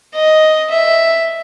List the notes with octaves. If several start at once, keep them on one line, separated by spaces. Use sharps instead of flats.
D#5
E5